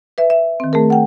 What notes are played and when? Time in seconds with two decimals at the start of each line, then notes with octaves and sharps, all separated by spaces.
0.18 B4 E5
0.30 E5
0.60 D#3 C4
0.73 A3 G#4 A#4
0.90 F#5 G5